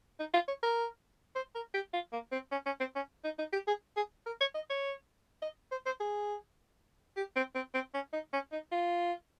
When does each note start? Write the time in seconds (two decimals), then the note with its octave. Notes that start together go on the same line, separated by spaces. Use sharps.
0.20 D#4
0.34 F4
0.48 C#5
0.63 A#4
1.35 C5
1.55 A#4
1.74 G4
1.93 F4
2.12 A#3
2.32 C4
2.52 C#4
2.66 C#4
2.80 C4
2.96 C#4
3.24 D#4
3.39 D#4
3.53 G4
3.68 G#4
3.97 G#4
4.26 A#4
4.41 C#5
4.55 D#5
4.70 C#5
5.42 D#5
5.71 C5
5.86 C5
6.00 G#4
7.17 G4
7.36 C4
7.55 C4
7.74 C4
7.94 C#4
8.13 D#4
8.33 C#4
8.52 D#4
8.72 F4